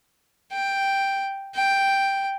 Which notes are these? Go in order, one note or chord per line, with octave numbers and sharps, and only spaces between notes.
G5
G5